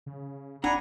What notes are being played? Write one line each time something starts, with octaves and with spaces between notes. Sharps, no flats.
C#3
F1 D4 F#5 G#5 A#5 B5